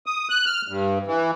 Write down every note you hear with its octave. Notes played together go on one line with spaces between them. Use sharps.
D#6
F#6
F6
G2
E3